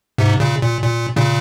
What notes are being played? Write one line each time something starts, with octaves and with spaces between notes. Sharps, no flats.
G#2 C3
A#2 C#3
A#2
A#2
A#2 C#3